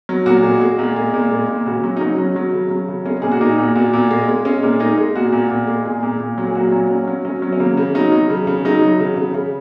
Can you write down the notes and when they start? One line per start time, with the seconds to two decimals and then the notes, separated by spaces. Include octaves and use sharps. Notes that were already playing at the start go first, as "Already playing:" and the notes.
0.09 F#3
0.26 A#2 F#4
0.43 G#3
0.61 G#3
0.79 A#2
0.96 G#3
1.14 A#2
1.31 G#3
1.49 A#2
1.66 C#3 F#4
1.84 F#3
1.97 D#4
2.01 F#3 C#4
2.18 F#3
2.36 F#3
2.53 C#3
2.71 F#3
2.88 C#3
3.06 G#3 C#4
3.22 A#2 G#4
3.31 F#4
3.41 A#2 D#4
3.58 A#2
3.75 A#2 F#4
3.93 A#2
4.11 G#3
4.28 G#3
4.45 G#3 C#4
4.63 A#2
4.80 G#3 D#4
4.98 G#3
5.15 A#2 F#4
5.32 A#2
5.50 A#2
5.67 G#3
5.85 A#2 G#4
6.03 A#2
6.20 A#2
6.38 F#3
6.47 G#4
6.55 A#2 F#4
6.72 F#3
6.90 F#3 C#4
7.07 F#3
7.25 F#3 C#4
7.42 F#3
7.52 C#4
7.60 C#3 A#3
7.77 C#3
7.95 F#3 D#4
8.12 F#3
8.30 C#3
8.47 C#3
8.65 F#3 D#4
8.82 F#3
9.00 C#3
9.17 C#3
9.34 C#3